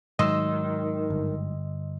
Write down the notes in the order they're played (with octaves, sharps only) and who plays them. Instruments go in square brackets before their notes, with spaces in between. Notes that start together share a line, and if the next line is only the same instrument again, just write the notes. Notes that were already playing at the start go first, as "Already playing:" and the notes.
[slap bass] G#2 F#3 [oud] D#3 [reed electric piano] D#5 C6 E6
[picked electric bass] G1